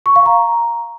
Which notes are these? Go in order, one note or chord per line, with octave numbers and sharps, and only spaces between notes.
C#6
F5
A#5